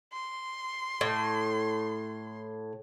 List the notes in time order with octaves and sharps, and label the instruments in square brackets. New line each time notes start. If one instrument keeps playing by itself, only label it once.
[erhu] C6
[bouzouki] A2